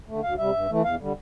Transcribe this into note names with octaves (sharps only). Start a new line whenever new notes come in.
D3 A3
D2 F5
C3 G3 E5
G2
E3 A3
E2 F5
D3 G3